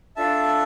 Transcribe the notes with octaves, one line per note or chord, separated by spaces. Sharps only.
D4 F4 A4 E5 A5